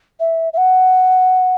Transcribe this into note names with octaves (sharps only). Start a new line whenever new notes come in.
E5
E5
F#5